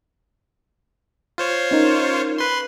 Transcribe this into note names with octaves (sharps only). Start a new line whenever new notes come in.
F4 C5 C#5
C#4 D#4 A#4
B4 C6